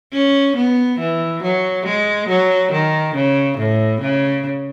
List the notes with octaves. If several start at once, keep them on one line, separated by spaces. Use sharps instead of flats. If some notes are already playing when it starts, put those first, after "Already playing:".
C#4
B3
E3
F#3
G#3
F#3
D#3
C#3
A2
C#3